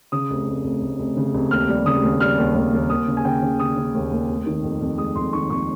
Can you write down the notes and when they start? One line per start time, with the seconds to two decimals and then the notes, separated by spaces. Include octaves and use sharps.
0.12 C#3 D#6
0.31 F1
0.48 F1
0.64 F1
0.82 F1
0.99 F1
1.17 C#3
1.35 F1
1.51 D#2 F6
1.69 G3
1.86 C#3 D#6
2.03 D#2
2.20 G3 F6
2.38 D#2
2.55 D#2
2.73 D#2
2.90 D#2 D#6
3.08 C#3
3.17 G#5
3.25 C#3 G5
3.42 C#3
3.59 C#3 D#6
3.76 C#3
3.94 D#2
4.12 D#2
4.29 F1
4.46 D#3
4.64 F2
4.81 F2
4.98 G#3 D#6
5.15 F2 C6
5.33 D#3 C#6
5.50 F2 C#6